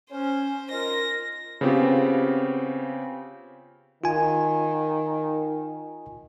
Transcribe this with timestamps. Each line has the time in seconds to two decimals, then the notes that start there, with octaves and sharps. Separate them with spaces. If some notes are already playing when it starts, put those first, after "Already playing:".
0.11 C#4 C5
0.71 D#4 F4 A#4 A#6
1.61 C#3 B3 C4 F4 G4
4.04 D#3 F4 G#5